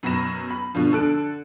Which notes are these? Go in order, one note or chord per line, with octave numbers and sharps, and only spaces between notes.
F#2 B2 F#3 B5 A#6 E7
B5
B2 D3 F3
D3 A4 F#6 D7